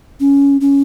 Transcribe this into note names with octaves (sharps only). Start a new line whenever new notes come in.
C#4
C#4